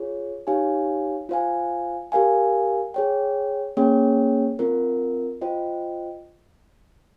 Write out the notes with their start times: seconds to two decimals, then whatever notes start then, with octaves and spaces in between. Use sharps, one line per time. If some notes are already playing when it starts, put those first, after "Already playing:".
Already playing: F4 G#4 C#5
0.47 D#4 G4 C#5 F5 G#5
1.29 F4 C5 F5 G#5
2.12 G4 A#4 F5 G#5
2.94 G#4 C#5 G5
3.77 A#3 C#4 G#4 C#5 G5
4.59 C4 F4 A#4
5.41 F4 C5 D#5 G5